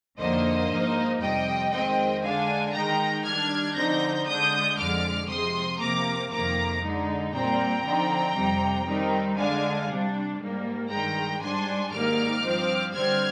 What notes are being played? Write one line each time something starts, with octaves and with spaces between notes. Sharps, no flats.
F2 D3 F3 A#3 D#4 C5 D#5
G#2 F3 A#3 D#4
F2 C3 G3 D#5 G5
D#3 G#3 C4 D#5 G5
D3 G#3 D4 F5 G#5
D#3 G#3 D#4 G5 A#5
D#3 G3 D4 F6 G#6
D3 F3 C4 D#4 G6 A#6
D3 G#3 D4 D#6 G6
F2 D3 G#3 D6 F6
C3 F3 G#3 C6 D#6
C3 F3 A#3 A#5 D6
F2 C3 D#3 A#3 A#5 D6
D3 G#3 D#4
A#2 G3 C4 G5 A#5
D3 F3 C4 D#4
F2 C3 G3
D#3 G3 C4 D#4
D3 G#3 D4 F5 G#5
C3 G3 D4
G#2 G3 A#3
G2 D#3 G#3 G5 A#5
G#2 G3 D4 G#5 C6
G#2 D#3 G3 A#3 D#4 D6 F6
G2 F3 C4
D3 G3 C4 F6 G#6